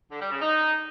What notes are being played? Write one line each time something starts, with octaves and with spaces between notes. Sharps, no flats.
D3
G3
C#3
D#4